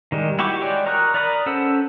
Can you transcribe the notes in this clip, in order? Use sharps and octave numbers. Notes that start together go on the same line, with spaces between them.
D#3 G3 G#3
E4 F#4 G4 C#6 D6
G#3 F#4 C#5 D5 G5
A#4 A#5 C#6 D#6 F#6
A#4 D5 A#5 B5 D#6
C#4 A4 C5 F#5 E6